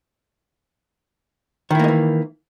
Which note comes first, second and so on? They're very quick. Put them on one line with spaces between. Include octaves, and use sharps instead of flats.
D#3 E4 A#3 G#3 E3